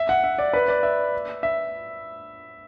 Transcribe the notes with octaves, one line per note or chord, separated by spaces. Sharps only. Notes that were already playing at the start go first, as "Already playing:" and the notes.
Already playing: E5
F#5
E5
D5
B4
D5
E5
E5